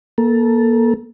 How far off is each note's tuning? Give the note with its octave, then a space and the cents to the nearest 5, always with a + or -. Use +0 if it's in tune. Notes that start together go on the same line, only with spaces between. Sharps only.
A#3 +25 A4 +0